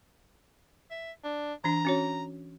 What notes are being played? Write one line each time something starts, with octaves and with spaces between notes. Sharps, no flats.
E5
D4
E3 D4 A#5
C#4 F#4 C#5